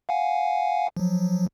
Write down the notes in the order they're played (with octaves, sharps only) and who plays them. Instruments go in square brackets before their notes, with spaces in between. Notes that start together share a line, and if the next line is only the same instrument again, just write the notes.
[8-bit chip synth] F5 F#5 G#5
F3 F#3